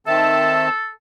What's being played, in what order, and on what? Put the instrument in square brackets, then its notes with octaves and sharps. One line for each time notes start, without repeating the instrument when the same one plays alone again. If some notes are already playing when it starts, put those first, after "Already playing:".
[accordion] D#3 C4 A5 [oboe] A4 [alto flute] E5